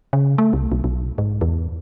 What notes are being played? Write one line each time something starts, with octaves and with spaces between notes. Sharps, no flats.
C#3
A3
C2
B1
B1
G#2
E2